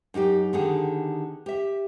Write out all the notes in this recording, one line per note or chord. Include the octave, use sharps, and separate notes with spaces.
F#2 D#4 F#4 G4
D3 D#3 B3 G4 G#4
G4 E5